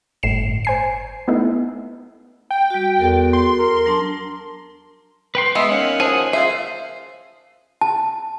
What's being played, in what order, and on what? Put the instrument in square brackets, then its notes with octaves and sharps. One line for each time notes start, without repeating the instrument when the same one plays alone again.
[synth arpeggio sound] G1 A2 C7 E7
C5 G#5 C7
A3 B3 D#4 E4
[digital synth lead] G5
[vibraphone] G3 F#4
[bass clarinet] E2 [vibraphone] F#4 A4 A#4
[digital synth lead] C6
[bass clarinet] A#4
[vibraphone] F#3 D4 A5
[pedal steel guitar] B4 G5 C6
[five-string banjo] G#3 [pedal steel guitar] B3 [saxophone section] D#5 E5
[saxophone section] D#3 A#3 C#4 [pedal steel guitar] F#5
[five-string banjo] F3 [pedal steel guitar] G#4 F#5 G#5
[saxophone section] C#3 F4 [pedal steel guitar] C5 [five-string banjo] E5
[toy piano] A5